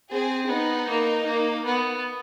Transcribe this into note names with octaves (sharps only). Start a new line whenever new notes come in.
C4 G#4
B3 D#4
A#3
A#3
B3